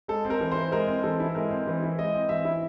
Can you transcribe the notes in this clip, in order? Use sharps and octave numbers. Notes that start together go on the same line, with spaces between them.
G#3 A4
C4
A#4
E3
E4 C5
G#3 A#4
C4
E3 A4
E4
G#3 A#4
C4
E3
E4
G#3 D#5
C4
E3 E5
E4